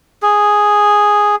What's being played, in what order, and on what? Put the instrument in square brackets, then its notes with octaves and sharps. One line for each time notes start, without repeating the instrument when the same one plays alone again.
[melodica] G#4